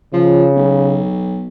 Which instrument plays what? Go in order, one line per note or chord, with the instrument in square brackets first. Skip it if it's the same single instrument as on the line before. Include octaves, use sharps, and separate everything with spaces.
[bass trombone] C#3 [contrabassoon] F3
[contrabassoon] B1